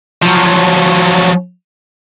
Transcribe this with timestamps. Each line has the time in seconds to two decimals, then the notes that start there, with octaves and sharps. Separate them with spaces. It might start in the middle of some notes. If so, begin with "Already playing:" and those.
0.23 F3 F#3